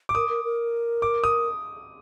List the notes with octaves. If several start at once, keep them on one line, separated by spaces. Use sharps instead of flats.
D6
A#4 D#6
A#4
A#4
D6
D#6